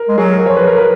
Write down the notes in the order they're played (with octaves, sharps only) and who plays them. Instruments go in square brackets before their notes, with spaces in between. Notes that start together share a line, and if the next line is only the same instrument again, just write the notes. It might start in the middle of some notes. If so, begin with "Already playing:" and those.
Already playing: [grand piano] A#4
[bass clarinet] G#3
[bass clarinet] F#3 [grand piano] G#4
[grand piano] A#4
[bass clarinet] F3 [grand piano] C#5
[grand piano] B4
A#4
B4